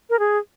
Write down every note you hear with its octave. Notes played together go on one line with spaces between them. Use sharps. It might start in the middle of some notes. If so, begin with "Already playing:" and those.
A#4
G#4